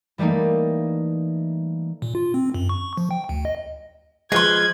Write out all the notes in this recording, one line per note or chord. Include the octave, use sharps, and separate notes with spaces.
E3 G3 A3 A#3 D#4
A#2
F4
C4
F#2
C#6
F3
G5
D2
D#5
F3 G#3 B4 C6 G#6